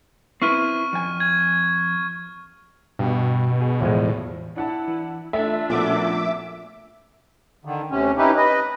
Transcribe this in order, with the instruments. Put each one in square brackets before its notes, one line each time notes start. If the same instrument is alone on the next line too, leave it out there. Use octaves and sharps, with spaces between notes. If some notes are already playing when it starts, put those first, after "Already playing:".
[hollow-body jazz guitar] C4 E4 B4 [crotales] C#6 F6 D#7
[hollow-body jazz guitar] F2 G#5
[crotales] G#6
[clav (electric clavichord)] G2 [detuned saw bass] B2
[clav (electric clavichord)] G#4
[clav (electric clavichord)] E2 F3 G#3 [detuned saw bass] A2
[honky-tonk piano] D4 F#5 A5 [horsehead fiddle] E4
[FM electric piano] E3
[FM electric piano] A3 [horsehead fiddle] D4 F4 [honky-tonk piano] E5
[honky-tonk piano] A#2 B3 [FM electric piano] F3 A3 F#4 [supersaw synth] E5 D6
[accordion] D3 D#3
D2 C3 C#4
C#4 D#4 E4 G4 B4
B4 D#5